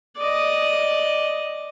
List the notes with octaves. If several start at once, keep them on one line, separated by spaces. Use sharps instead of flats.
D5 D#5